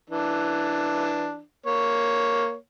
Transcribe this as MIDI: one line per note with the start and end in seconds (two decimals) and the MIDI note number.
0.10 1.40 52
0.10 1.40 62
1.66 2.55 58
1.66 2.55 73